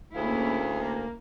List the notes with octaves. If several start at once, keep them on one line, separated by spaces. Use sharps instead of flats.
D2 G#2 A#3 C#4 E4 G#4 F5
A#3